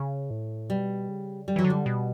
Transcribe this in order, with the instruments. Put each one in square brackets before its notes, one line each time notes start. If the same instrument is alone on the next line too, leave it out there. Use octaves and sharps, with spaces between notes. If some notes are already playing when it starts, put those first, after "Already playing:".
Already playing: [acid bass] C#3
A2
[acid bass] B2 [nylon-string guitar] G3
[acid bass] C#3
[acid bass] D3 [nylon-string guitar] G3
[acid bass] E3 [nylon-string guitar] F#3
[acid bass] D3
[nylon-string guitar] G3
[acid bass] B2